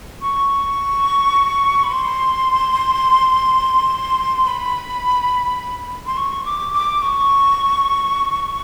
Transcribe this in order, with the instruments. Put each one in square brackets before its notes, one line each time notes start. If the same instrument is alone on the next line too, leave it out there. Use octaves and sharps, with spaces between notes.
[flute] C#6
B5
C6
B5
C6
C#6
D6
D6
C#6